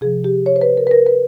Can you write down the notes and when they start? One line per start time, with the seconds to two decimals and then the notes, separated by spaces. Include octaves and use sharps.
0.01 C3 F3 G#4
0.24 G4
0.46 C#5
0.56 C5
0.61 B4
0.77 A#4
0.87 B4
0.91 A#4
1.07 B4